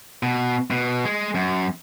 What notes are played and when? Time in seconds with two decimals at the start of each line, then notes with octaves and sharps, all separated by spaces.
0.23 B2
0.71 B2
1.05 G#3
1.35 F#2